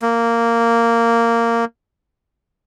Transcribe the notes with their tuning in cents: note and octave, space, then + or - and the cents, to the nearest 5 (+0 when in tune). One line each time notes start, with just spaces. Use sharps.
A#3 -10